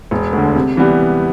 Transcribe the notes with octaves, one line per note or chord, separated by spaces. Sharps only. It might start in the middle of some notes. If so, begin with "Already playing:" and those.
E1
D2
D3
C3
E3 G3 B3